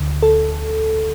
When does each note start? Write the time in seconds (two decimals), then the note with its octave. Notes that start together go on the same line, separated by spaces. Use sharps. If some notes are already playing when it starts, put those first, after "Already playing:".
Already playing: D2 D3
0.23 A4